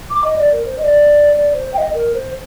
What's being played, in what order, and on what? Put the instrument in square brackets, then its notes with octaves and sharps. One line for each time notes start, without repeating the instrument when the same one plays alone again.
[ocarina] D6
D#5
D5
A#4
C5
D#5
D5
D5
C5
G5
D#5
A#4
C5